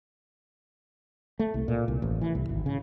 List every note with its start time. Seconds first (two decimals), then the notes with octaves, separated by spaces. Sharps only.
1.39 A3
1.54 C2
1.68 A#2
1.88 C2
2.02 A1
2.21 E3
2.35 C2
2.49 G#1
2.66 C#3